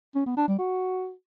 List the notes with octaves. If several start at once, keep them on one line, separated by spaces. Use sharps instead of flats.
C#4
B3
D4
G3
F#4